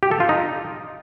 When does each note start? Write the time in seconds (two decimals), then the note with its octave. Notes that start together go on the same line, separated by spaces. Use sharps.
0.03 G4
0.11 A4
0.20 F4
0.29 D#4